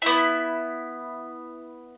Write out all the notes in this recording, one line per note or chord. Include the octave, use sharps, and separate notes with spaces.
B3 E4